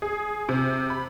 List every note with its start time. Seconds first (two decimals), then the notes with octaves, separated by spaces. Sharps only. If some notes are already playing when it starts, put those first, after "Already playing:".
0.02 G#4
0.49 C3
0.90 B5